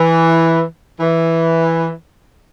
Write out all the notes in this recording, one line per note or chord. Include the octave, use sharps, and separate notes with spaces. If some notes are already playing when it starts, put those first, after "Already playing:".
Already playing: E3
E3